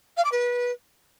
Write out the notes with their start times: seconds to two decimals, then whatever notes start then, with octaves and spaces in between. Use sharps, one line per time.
0.17 F5
0.24 D6
0.32 B4